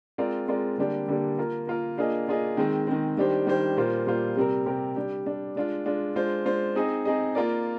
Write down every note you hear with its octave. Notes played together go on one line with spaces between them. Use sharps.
G#3 C4 F4 A#4 D5
G#3 C4 F4 A#4 D5
D3 G3 A#3 D4 G4
D3 G3 A#3 D4 G4
A#3 F4 A#4
A#3 F4 A#4
A#3 D4 F4 G#4 D#5
A#3 D4 F4 G#4 D#5
D#3 G#3 C4
D#3 G#3 C4
D#3 G3 D4 G4 C5
D#3 G3 D4 G4 C5
A#2 G3 A#3 F4 C5
A#2 G3 A#3 F4 C5
C3 G3 C4 G4 A#4
C3 G3 C4 G4 A#4
G3 D4 G4
G3 D4 G4
G#3 D4 F4
G#3 D4 F4
G#3 D4 F4 C5
G#3 D4 F4 C5
C4 D#4 G#4 D#5
C4 D#4 G#4 D#5
A#3 F4 A#4 D5